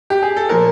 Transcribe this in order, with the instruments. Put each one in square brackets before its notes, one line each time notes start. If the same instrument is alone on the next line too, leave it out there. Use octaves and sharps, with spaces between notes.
[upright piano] G4
G#4
A4
A#2 F3 A#4